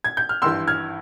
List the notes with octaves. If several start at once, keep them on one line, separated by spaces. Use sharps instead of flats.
G#6
G6
F6
G#1 G2 E3 C6 E6
F6 G#6